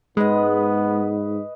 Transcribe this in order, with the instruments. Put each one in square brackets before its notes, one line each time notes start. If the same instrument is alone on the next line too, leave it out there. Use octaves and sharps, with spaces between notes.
[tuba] G#2 [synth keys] G#3 [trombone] B3 [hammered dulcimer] B4 D#5